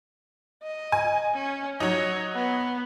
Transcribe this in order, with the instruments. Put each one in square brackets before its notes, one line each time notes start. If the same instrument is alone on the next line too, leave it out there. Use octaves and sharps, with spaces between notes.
[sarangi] D#5
[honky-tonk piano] G#5
[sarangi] C#4
[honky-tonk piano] F#3 D#4 [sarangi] C#5
[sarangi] B3